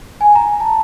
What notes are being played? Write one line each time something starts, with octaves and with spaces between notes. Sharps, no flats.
G#5
A#5
A5